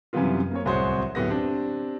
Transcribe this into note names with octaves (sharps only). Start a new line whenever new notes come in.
F#2 C3 E3 G3 B3 F4
A#3 C4 C#5
D1 C2 F#4 G#4 C5 C#5
D1 A2 B3 G4 A#6
C4 D4 G4